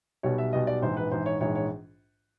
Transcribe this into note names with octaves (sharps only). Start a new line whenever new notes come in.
B1 B2 G3 C#5
E5
B1 B2 G3 D#5
D5
A#1 G#2 E3 C5
B4
A#1 G#2 E3 C5
C#5
A#1 G#2 E3 G#3 C#5
C#5